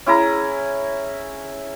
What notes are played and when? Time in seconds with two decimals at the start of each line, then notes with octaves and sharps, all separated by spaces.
0.06 C#4 E4 G#4 A#5